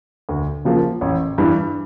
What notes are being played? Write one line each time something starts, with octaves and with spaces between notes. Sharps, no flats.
D2
C#3 F3 A#3
A1
G2 E3 G3